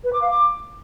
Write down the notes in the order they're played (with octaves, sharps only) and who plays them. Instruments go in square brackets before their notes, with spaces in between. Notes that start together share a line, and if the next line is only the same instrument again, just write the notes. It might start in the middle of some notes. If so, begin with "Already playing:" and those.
[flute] B4
D6
F5
D6